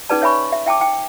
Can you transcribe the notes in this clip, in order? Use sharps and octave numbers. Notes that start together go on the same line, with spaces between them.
C#4 D#4 G#4 B4 D5 A5
C#5 E5 G#5 B5 C#6
E5
E5 G5 A5 D6
G5